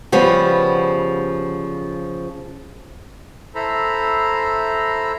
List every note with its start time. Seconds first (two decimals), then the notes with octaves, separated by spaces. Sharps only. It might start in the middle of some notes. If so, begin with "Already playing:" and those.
0.12 C#3 F3 G3 B3
3.55 E4 A4 C5 A#5 B5